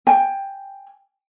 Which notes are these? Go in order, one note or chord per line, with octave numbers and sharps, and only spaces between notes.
G5 G#5